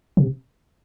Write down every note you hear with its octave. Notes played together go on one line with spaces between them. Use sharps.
C3